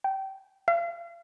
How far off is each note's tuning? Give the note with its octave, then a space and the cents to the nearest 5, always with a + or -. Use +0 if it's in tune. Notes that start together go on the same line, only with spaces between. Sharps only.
G5 -20
F5 -40